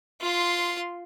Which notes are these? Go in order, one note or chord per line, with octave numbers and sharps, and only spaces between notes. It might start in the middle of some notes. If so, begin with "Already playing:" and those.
F4 C6